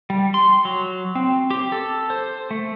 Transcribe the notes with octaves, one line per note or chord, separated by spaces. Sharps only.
G3
C6
F#3
C4
G4
A4
C5
A3